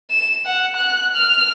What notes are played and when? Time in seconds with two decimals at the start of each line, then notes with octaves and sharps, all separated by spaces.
0.11 E7
0.46 F#5
0.76 F#6
1.14 F6